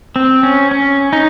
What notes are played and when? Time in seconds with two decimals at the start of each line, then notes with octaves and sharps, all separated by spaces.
0.16 C4
0.43 C#4
0.71 C#4
1.13 D#4